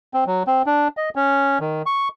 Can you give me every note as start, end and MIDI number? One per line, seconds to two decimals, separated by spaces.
0.14 0.24 60
0.27 0.43 54
0.47 0.62 60
0.66 0.88 62
0.97 1.10 75
1.16 1.59 61
1.61 1.82 51
1.86 2.08 85